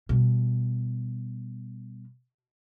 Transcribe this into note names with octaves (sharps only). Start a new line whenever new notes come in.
B2 G3